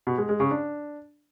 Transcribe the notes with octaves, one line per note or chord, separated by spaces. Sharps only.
B2
G#3
G#3
C#3
D4